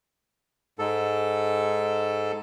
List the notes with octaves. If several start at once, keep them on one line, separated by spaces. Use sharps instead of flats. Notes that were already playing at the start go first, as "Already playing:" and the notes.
G#2 A4